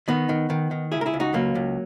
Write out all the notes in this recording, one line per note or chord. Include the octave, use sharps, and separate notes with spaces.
D#3 B3 D#4
D#3
D#3
D#3
C#2 E4 G#4
A#4
E4 G#4
C#2
D#4 F#4
C#2 F#3 A#3
C#2